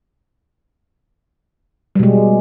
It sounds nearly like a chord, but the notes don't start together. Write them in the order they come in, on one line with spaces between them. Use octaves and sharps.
G3 B2 G#3